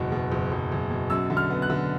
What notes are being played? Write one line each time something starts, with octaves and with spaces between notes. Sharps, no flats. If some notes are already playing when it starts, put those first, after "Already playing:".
Already playing: F#1 E2 B2
B2
F#1
F#1
F#1
B2
F#2 E6
D3
F6
B3
F#6
D3